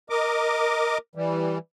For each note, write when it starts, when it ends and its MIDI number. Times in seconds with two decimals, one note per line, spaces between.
0.10 0.98 70
0.10 0.98 75
0.10 0.98 86
1.15 1.58 52
1.15 1.58 55